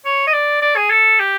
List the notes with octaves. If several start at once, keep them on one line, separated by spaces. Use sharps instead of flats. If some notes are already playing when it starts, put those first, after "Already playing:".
C#5
D#5
D5
D5
G#4
A4
G4